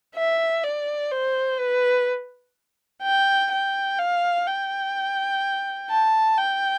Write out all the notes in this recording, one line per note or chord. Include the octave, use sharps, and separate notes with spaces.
E5
D5
C5
B4
G5
G5
F5
G5
A5
G5